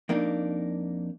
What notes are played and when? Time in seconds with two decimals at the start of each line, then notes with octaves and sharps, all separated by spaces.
0.09 F2 A#3 D4 D#4